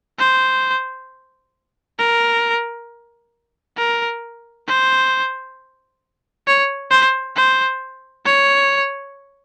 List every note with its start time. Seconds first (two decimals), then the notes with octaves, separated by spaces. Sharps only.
0.19 C5
1.99 A#4
3.78 A#4
4.68 C5
6.47 C#5
6.91 C5
7.36 C5
8.26 C#5